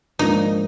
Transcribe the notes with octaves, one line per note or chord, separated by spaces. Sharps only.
G#2 F3 A#3 D4 D#4